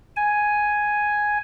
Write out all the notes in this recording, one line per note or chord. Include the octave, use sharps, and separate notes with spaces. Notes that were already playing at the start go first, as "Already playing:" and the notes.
G#5